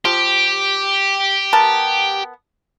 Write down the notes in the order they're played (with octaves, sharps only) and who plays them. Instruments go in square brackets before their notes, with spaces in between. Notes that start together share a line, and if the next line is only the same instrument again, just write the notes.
[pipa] F3 [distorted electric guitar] G4
[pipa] B3 A#4 A5